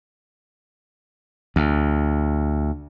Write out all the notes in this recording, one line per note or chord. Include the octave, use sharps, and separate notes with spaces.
D2